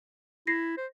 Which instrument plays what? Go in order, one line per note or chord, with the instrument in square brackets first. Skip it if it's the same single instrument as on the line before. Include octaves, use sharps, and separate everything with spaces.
[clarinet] E4 [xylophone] A#6 C7
[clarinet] C5